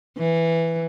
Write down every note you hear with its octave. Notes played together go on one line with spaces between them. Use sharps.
E3